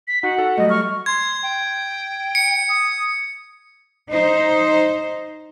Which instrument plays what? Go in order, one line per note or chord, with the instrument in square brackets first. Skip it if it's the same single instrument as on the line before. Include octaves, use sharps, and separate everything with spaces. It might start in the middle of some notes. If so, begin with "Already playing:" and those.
[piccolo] B6
[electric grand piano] D#4 [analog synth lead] F#4 [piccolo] F#5
[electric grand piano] A4
[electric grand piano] F#3 G3 A3 [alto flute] D#5
[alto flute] C#6 [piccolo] F6
[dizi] C6 [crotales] G#6
[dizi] G5
[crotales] C#7
[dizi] D#6
[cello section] D#4 C5